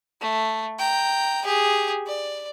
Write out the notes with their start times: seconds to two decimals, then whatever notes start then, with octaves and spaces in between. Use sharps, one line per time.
0.21 A3
0.79 G5 A#5
1.45 G4 G#4
2.07 D5